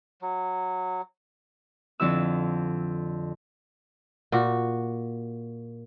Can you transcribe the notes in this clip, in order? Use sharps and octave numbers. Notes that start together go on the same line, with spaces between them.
F#3
F2 D3 F3 E4 E6
A#2 F#4